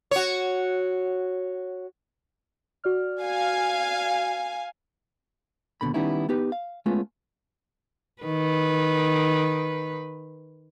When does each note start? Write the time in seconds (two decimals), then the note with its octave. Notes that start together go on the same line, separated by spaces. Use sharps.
0.11 F#4 C#5
2.84 F#4 D5 F6
3.23 F5 G#5
5.81 D#2 B2 D3 B5
5.94 D#3 G3 B3 C#4 D#4 E4
6.29 B3 D#4 G4 B4
6.52 F5
6.86 G#3 A3 B3 C#4 F4
8.22 D#3 B4